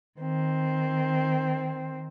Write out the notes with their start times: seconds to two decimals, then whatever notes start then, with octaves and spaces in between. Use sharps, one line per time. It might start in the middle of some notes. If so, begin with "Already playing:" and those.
0.19 D#3 C4